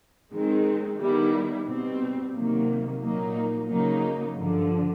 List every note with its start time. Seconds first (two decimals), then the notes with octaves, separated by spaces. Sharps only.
0.32 D#3 G#3 C4
1.00 D#3 G3 B3 E4
1.67 B2 G3 C4
2.34 C3 D#3 F#3 A#3
3.02 A#2 F#3 A#3 D#4
3.69 C#3 F#3 A#3 D#4
4.36 G2 D3 F3